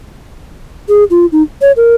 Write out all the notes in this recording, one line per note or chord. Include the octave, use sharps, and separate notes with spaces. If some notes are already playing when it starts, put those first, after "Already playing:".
G#4
F4
D#4
C#5
A#4